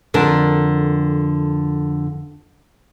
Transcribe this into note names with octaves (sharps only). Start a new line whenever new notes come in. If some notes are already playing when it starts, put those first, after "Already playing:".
F2 D3 A#4 A5